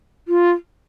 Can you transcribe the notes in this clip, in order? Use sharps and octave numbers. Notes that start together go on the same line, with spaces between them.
F4